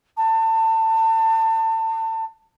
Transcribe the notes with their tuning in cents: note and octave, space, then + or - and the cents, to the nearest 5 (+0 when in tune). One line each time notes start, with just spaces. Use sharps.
A5 +30